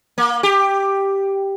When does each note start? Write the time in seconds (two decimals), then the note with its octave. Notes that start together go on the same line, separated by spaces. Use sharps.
0.18 A#3
0.43 G4